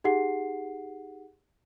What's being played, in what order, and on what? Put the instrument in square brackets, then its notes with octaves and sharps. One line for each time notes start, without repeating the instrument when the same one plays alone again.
[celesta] D#4 G4 G#4 F#5 C7